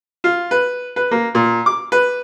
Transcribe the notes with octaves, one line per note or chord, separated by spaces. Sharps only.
F4
B4
B4
A#3
A#2
D6
B4